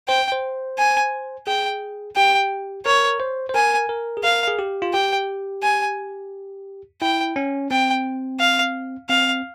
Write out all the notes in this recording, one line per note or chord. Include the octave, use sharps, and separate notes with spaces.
C5 G5
C5
G#5
G#4 G5
G4 G5
A#4 C#5
C5
C5
A#4 G#5
A#4
G#4
A#4 F5
G#4
G4
F4
G4 G5
G#5
E4 G5
C#4
C4 G5
F5
C4 F5